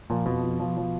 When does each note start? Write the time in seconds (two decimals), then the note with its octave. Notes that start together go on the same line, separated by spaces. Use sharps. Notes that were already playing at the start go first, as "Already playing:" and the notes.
0.10 A#2 F3
0.26 F2 B2
0.43 F4
0.60 F3
0.77 F3